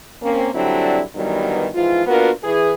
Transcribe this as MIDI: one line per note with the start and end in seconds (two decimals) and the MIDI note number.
0.22 0.49 58
0.22 0.49 60
0.22 0.49 61
0.54 1.01 50
0.54 1.01 54
0.54 1.01 55
0.54 1.01 60
0.54 1.01 62
0.54 1.01 64
1.15 1.67 43
1.15 1.67 51
1.15 1.67 52
1.15 1.67 54
1.15 1.67 55
1.15 1.67 59
1.74 2.02 44
1.74 2.02 52
1.74 2.02 53
1.74 2.02 65
2.07 2.30 58
2.07 2.30 59
2.07 2.30 62
2.07 2.30 65
2.07 2.30 66
2.07 2.30 70
2.43 2.73 52
2.43 2.73 68